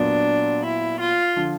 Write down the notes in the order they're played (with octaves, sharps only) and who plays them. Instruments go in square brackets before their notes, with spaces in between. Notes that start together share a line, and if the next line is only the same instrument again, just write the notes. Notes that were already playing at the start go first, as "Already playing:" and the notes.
Already playing: [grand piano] A#2 F#3 B3 [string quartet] D4
[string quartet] E4
F4
[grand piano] D3 F3